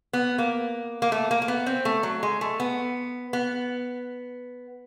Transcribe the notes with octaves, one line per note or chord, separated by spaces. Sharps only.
B3
A#3
A#3
A3
A#3
A#3
B3
C4
A3
F#3
G#3
A3
B3
B3